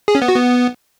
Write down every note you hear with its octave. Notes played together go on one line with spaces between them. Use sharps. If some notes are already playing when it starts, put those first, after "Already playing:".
G#4
C#4
B3
F#4
B3